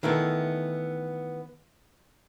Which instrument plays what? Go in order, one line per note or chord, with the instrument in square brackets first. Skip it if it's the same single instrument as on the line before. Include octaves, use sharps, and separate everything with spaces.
[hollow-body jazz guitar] D#3 E3 A3 B3